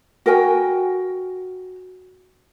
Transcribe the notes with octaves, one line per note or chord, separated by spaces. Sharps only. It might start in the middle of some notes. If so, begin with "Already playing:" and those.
F#4 A#4 G5 G#5